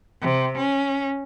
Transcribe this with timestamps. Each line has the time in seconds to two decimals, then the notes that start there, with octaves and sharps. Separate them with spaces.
0.21 C3
0.57 C#4